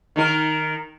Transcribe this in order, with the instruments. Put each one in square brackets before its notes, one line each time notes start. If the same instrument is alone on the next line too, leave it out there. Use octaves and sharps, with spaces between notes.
[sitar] D#3 D#4 A#4